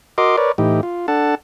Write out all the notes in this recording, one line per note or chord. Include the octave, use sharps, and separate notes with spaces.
F#4 A#4 D#5 C6 D6
A#4 B4 C#5 D5
A2 E3 D#4 G4
F4
D4 A4 F#5 A5